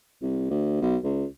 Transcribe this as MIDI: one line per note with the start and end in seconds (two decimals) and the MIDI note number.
0.22 0.50 36
0.50 0.76 38
0.81 0.97 35
1.04 1.25 37